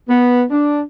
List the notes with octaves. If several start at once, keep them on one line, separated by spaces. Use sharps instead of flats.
B3
D4